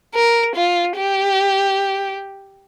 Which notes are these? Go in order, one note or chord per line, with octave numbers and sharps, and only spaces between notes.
A#4
F4
G4